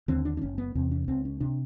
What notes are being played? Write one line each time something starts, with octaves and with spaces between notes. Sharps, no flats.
D#2 D3 C4
D4
D4
F#1 C#4
B3
E2 C3 C4
C#4
C#2 C4
C#4
C3 D4